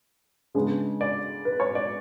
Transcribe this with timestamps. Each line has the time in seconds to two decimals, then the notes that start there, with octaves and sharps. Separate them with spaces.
0.55 C#3 G#3 B3 D4
1.01 D5
1.45 B4
1.60 C#5
1.75 D5